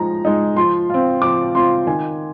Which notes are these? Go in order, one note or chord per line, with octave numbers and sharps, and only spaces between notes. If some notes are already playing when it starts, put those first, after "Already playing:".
Already playing: F3 G#3 D#4 A#5
G#3 D#4
F3 C6
C4 F4
F3 D6
C4 F4 C6
D#3 G#5